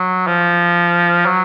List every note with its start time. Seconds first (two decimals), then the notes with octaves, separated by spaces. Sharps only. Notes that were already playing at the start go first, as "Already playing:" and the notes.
Already playing: F#3
0.27 F3
1.26 F#3